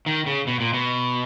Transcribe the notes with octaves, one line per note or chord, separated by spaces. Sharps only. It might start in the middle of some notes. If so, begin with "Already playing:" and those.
D#3
C#3
B2
A#2
B2